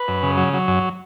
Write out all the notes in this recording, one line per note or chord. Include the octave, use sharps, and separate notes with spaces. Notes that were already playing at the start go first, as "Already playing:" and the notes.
Already playing: B4
F#2
C#3
F#3
F#3
F#2